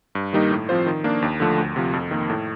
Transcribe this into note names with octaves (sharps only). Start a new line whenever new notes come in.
G2
D#3 G3 A#3 D#4
A2
F3 C4 F4 C5
D#3
A#3 D4
D#2
D3 F3 A3
D2
C3 F3
F2
D#3 A#3
A2